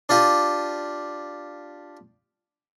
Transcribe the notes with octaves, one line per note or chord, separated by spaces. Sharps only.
D4 F4 G4 D#5